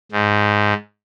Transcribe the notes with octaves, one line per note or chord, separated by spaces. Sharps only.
G#2